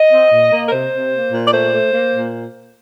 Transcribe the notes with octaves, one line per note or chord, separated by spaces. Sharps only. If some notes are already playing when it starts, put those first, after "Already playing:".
Already playing: D#5
C4
A#2
A#3
A#4
C3 C5
C3
A#3
A#2
D5
A3 C5
A3
A#3
A#2